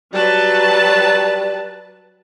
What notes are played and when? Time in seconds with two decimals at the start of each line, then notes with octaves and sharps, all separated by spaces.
0.14 F#3 G3 B4 A5